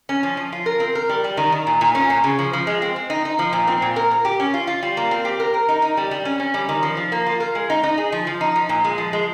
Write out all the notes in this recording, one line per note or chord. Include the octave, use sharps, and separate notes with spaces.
C#4
F3
F3
F4
A#4
C4
A#4
G3
G3
D#3
D#3
A#2
A#2
C#4
A#2
C#3
F3
F3
G#3
C4
C4
D#4
D#4
F3
A#2
C4
A#2
A#4
A#4
G4
C#4
F4
F4
G3
A#3
C4
G4
A#4
A#4
D#4
D#4
G3
G3
C#4
C#4
G3
D#3
F3
F3
A#3
F4
A#4
G#3
D#4
D#4
G#4
F3
F3
D#4
F3
A#2
G#3
F3
G#3